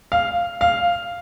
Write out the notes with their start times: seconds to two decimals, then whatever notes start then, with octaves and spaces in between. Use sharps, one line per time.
0.12 F5
0.61 F5